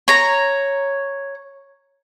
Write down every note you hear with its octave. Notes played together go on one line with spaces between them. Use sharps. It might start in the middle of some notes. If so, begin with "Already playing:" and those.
C#5 A#5